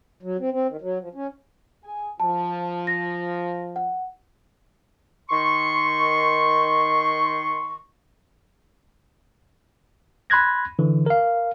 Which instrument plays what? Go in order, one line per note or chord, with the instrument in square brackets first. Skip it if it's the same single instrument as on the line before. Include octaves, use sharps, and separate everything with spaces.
[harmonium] F#3
C4
C4
D#3
F#3
F3
C#4
[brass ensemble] G#4 G#5
[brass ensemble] F3 [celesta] A5
[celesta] A#6
F#5
[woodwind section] D#3 C6 C#6
[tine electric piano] B5 C6 F#6 G#6 A#6
D3 E3
A#4 F5